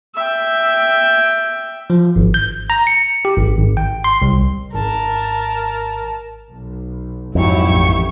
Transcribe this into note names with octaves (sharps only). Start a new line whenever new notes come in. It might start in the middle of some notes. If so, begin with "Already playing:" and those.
E5 G5
F3
G#1
G6
A#5
C#7
G4
G#1
G#1
G5
C6
C2
G#1 A#4 A5
B1
F2 G#2 F#3 E4 G4 C#6
A1